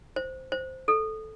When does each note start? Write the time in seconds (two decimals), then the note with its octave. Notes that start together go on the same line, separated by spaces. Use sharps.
0.16 C5
0.52 C5
0.88 A4